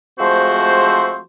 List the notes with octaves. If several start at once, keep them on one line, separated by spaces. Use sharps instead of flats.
F3 G#3 A3 C4 F#4 C5